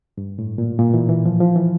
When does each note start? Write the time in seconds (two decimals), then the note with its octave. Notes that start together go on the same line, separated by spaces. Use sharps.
0.18 G2
0.39 A2
0.58 A#2
0.79 A#2
0.94 E3
1.09 E3
1.25 F3
1.40 F3
1.55 E3